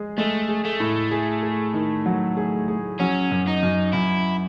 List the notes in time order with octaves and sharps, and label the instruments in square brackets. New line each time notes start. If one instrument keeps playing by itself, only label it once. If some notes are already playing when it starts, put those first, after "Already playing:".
Already playing: [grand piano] G#3 G#4
[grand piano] G#3 [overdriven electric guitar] A3
[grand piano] G#4
[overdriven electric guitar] A3
[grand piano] A2
G#4
G#4
D#3
F#3
G#4
G#4
[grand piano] F#3 [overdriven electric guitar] C#4
[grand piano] F#2
[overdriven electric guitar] D#4
[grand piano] F#2
[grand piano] F#2 [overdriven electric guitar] E4